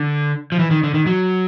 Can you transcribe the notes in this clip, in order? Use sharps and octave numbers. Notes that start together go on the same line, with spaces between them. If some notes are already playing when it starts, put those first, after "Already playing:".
Already playing: D3
F3
E3
D#3
D3
D#3
F#3